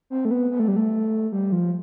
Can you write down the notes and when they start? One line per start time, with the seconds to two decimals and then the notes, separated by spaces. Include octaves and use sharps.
0.10 C4
0.25 A3
0.31 B3
0.51 B3
0.59 A3
0.68 G3
0.76 A3
1.32 G3
1.52 F3